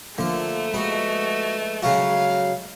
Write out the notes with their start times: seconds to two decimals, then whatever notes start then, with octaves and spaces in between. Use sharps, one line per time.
0.18 D3 F3 A3 A#3 F5
0.74 G#3 B3 F#4
1.82 C#3 F#3 F#4 F5